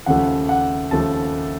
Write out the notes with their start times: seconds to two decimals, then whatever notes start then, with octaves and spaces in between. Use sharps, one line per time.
0.06 D#2 C#3 F3 A3 F#5
0.49 F#5
0.91 D#2 C#3 F3 A3 A5